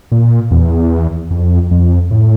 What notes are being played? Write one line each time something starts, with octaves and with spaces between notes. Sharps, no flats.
A#2
E2
F2
F2
A2